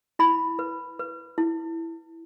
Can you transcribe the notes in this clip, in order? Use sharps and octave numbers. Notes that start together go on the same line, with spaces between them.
E4 B5
B4
B4
E4